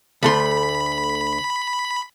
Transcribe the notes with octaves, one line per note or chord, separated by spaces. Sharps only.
D2 A3 B5 C6